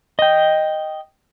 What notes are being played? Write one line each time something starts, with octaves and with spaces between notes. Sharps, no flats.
D#5 G5